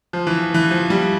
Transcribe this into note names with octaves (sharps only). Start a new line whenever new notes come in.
F3
E3
E3
F3
G3